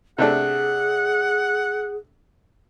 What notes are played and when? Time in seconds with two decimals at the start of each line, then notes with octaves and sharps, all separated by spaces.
0.18 C3 A3 D4 G#4 F#5